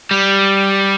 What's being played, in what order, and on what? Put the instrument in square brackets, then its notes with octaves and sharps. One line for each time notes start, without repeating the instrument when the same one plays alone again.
[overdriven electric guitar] G3